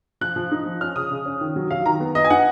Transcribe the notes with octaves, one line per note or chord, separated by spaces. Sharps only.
F3 F#6
F3
D#4
F3
C#4 F6
C#3 D#6
C#3
C#4
D#3
F#3
F#3 F5
D#3 A#5
B3
B3 D#5
G#5
D#4 F#5